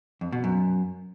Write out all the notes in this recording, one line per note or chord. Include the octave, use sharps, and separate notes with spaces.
F2
B2
F#2